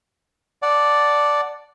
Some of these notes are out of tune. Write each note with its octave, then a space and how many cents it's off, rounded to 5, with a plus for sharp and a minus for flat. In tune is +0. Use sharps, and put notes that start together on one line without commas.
D5 +0 F#5 +0 A5 +0